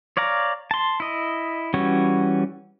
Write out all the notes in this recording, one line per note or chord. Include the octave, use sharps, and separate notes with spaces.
C#5 D5 F5 A#5
A5 C6
E4 D#5
E3 G3 C#4 F#4 C#5